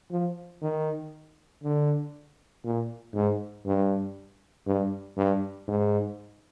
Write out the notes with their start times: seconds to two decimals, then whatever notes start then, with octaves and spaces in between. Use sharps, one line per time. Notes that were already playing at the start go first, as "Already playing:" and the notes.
0.11 F3
0.62 D#3
1.63 D3
2.65 A#2
3.15 G#2
3.66 G2
4.67 G2
5.17 G2
5.68 G#2